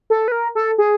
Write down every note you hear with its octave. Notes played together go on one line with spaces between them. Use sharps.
A4
B4
A#4
A4
G#4